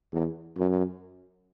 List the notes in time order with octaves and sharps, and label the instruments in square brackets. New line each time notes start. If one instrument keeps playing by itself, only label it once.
[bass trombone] E2
F#2